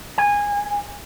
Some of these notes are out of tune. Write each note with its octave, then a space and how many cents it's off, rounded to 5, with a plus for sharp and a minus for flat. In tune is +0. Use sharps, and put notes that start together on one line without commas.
G#5 -20